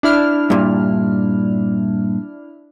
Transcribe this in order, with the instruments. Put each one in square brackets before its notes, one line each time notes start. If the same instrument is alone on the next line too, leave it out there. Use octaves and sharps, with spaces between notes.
[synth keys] D4 E4 F6
[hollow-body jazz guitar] G2 A#2